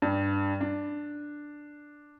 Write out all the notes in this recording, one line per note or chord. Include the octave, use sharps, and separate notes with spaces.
G2
D4